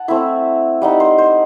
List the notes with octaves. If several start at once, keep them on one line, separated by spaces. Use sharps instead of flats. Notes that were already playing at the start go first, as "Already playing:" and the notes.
Already playing: F#5 A5
A3 C4 E4 E5
G3 D#4 F#5
C5
C5